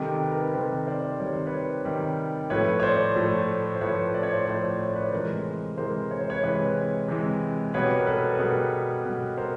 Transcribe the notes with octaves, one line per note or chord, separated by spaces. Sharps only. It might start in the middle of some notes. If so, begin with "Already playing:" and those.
Already playing: C3 D#3 G3 G4 A4
B4
A#4
A4 B4
C3 D#3 G3 A#4 C5
C5 D5
C3 D#3 G3 C#5
C5
B4 C#5
C3 D#3 G3
A2 F3 A3 B4 C#5
C#5
C5 D5
A2 F3 A3
C5
A2 F3 A3 B4 C#5
D5
C#5
C5 D5
A2 F3 A3 C5 D5
C#5
D5
B4 C#5
C3 E3 G#3 A#4 C5
C3 E3 G#3 A#4 C5
C#5
C5
B4 C#5
C3 E3 G#3 B4 C#5
C3 E3 G#3
B2 G3 B4 C#5
A#4
A4 B4
B4
B2 G3 G#4 A#4
B2 G3
A#4 C5